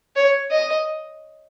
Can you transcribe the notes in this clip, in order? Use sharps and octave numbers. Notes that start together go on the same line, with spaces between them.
C#5
D#5